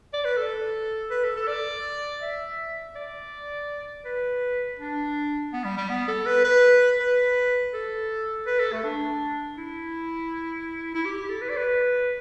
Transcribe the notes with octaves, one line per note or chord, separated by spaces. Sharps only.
D5
B4
A4
B4
A4
A4
D5
E5
D5
B4
D4
B3
G3
G3
B3
A4
B4
B4
B4
A4
B4
A4
A3
D4
E4
E4
G4
G4
A4
B4
D5
B4